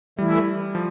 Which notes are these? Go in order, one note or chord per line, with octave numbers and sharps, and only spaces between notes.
E3 G3 A3 E4
F3